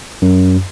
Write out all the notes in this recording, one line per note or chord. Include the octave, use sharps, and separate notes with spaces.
F#2